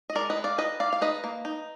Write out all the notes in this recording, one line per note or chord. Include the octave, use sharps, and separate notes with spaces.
D#5
G#3 A#4 D5
B4 D#5
G#3
D5 F5
D#3 B4 D#5
D#3 D5 F5
F5
D#4 B4 D#5
A#3
D#4